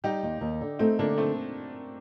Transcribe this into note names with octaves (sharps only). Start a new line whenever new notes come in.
G3 D#4 G4
D#2
D#2
D3
A3 C4 D#4
D3 A#3 D4
A3 C4